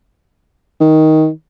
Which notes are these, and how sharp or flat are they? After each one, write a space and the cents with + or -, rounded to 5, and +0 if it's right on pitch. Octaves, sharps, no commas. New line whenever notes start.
D#3 +10